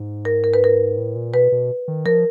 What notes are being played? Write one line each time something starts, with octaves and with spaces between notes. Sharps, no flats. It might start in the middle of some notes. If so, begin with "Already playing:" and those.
Already playing: G#2
A#4
A#4
B4
A#4
A2
A#2
B2 B4
B2
D#3
F3 A#4